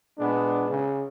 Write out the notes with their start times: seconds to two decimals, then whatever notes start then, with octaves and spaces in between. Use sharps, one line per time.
0.18 A#2 G#3 B3 D4
0.69 C#3